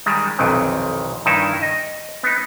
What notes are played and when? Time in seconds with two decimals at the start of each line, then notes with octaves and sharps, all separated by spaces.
0.06 D#3 G3 G#3
0.39 B1 F2 C3 D#3 E3
1.26 G2 D#3 D#4 E4 A5
1.62 D#5
2.23 B3 D#4